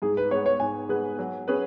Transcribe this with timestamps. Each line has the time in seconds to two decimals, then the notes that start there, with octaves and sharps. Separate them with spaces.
0.02 G#2 G#4
0.17 B4
0.31 G#3 B3 G#4 B4 C#5
0.46 C#5
0.60 G#2 G#5
0.89 G#3 B3 G#4 B4
1.18 F#3
1.48 C#4 G#4 B4